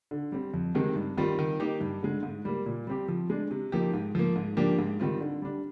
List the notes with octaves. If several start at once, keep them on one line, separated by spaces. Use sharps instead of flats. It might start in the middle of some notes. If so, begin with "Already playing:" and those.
D3
G3 C4
F2
C3 D#3 G#3 C4
G2
D#3 G3 C4 F4
D#3
A#3 D#4 G4
G2
D3 G#3
G#2
G3 A#3
A#2
G3 C4 G4
F3
G#3 D4
C3
F3 A#3 D#4 G4
G#2
F3 A#3
G#2
F3 A#3 D4 G4
G#2
D#3 G3 C4 F4
D3
G3 D4